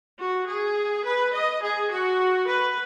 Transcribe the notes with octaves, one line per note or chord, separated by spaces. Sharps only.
F#4
G#4
B4
D#5
G#4
F#4
B4